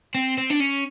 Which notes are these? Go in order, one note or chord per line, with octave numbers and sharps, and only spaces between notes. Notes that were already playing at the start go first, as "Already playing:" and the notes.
C4
C4
D4
C#4